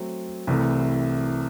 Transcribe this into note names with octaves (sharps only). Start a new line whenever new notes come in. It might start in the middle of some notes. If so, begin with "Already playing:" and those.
Already playing: F#3 A3 C4
C2 C3 E3 A3